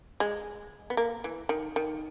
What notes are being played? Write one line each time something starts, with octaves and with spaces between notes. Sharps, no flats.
G#3
B3
A#3
E3
D#3
D#3